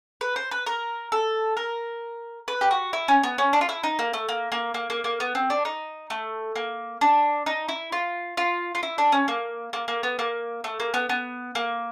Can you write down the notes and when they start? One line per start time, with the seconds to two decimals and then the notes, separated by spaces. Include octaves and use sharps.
0.21 B4
0.36 C5
0.51 B4
0.66 A#4
1.12 A4
1.57 A#4
2.48 B4
2.61 G4
2.71 F#4
2.93 E4
3.08 C#4
3.23 B3
3.38 C#4
3.53 D4
3.61 F4
3.69 E4
3.83 D#4
3.99 A#3
4.13 A3
4.29 A#3
4.52 A#3
4.74 A#3
4.90 A#3
5.04 A#3
5.20 B3
5.35 C4
5.50 D4
5.65 D#4
6.10 A3
6.56 A#3
7.01 D4
7.46 D#4
7.69 E4
7.92 F4
8.37 F4
8.75 F4
8.83 E4
8.98 D4
9.12 C#4
9.28 A#3
9.73 A#3
9.88 A#3
10.03 B3
10.19 A#3
10.64 A3
10.80 A#3
10.94 B3
11.09 B3
11.55 A#3